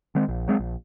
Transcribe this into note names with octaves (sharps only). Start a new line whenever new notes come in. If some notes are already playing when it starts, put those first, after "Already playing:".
D#3 G#3 C4
A#1
F#3 G#3 C4
A#1